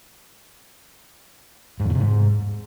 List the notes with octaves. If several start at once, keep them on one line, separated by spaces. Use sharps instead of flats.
G#2
E2
D3
C3
G#2